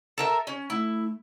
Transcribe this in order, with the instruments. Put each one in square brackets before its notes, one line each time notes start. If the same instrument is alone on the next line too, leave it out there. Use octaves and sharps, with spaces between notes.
[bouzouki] A4 A#4 E5
C#4
[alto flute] A3 [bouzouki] E4